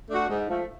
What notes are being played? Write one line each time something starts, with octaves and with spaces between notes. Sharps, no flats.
A3 D4 F#4
G#2
F3 A3